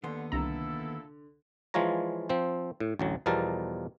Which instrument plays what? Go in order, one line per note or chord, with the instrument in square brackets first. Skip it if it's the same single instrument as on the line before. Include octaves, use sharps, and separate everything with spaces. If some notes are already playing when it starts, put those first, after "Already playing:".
[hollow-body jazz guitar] D#2 B3 C6 [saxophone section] D3
[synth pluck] C2 A#5 [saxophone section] A#2 E4 A4 [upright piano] D3
[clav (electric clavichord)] E3 F3 G#3 F4 C#5 A#5
F3 C4 C5
A2
A1 D2 F#3
E2 B2 F3 G3 A#4 A5